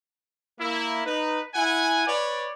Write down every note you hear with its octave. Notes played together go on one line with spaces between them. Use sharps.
A#3 E4
D#4 B4
E4 F#5 G#5
B4 C#5 D5